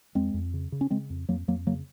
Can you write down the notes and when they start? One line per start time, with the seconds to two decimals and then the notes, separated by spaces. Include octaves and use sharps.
0.15 F2 G#3 C4
0.34 F2
0.54 C#3
0.72 C#3
0.81 C#4
0.91 C#3 G#3 C4
1.10 F2
1.29 F2 F#3 A#3
1.48 F2 F#3 A#3
1.67 C#3 F#3 A#3